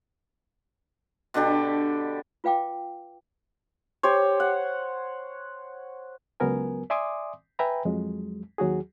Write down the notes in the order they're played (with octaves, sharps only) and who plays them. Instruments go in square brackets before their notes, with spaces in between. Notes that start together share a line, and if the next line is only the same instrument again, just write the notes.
[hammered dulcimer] B2 D3 D4 G4
[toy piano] F4 B4 F5 G5 D6
[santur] G4 C5 C#5
F#5
[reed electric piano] C#2 F#3 B3 A#4 G#5
D5 E5 G#5 C6 D6 D#6
B4 E5 G5 G#5 A#5 B5
F2 F#3 G#3
D#2 F#3 F#4 G#4